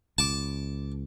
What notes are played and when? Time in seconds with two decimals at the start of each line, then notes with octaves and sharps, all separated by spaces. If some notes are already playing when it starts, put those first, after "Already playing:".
0.18 C#2 A5 D6